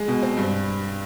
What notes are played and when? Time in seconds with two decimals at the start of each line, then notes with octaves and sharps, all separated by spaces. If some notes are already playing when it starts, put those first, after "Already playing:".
Already playing: G#3
0.08 B2
0.23 C4
0.37 G2